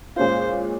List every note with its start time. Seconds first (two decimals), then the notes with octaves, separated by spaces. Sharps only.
0.16 A#2 G#3 C#4 F4 C5